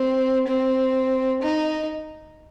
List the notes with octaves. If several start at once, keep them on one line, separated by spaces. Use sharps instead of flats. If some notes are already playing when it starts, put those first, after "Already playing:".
Already playing: C4
C4
D#4